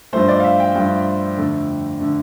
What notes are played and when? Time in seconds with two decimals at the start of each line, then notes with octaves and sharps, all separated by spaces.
0.13 G2 F3 A3 C5
0.28 D5
0.40 F5
0.44 E5
0.60 G5
0.75 G2 F3 A3 G5
1.37 F2 D3 A3
2.00 D3 A3